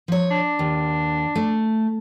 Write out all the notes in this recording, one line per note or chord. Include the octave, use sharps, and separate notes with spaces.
F3 C#5
D4
D#2
A3